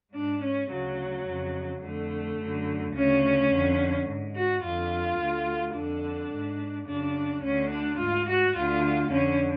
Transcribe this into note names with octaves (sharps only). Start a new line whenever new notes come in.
G#2 D4
C#4
D2 C#3 F#3
F2 C#3
F2 D3 A3
F#2 D3
D2 C#3 C#4
F2 D3
G#2
F#4
F2 D3 F4
D2 D3
F2 D3 D4
G#2
F#2 C#3 D4
D2 D3 C#4
D4
G#2 F4
F#4
D2 D3 F4
F2 D3 C#4